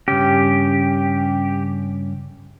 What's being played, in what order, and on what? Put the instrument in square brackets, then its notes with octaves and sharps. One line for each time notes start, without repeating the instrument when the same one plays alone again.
[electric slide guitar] G2 C#3 C#4 [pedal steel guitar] G4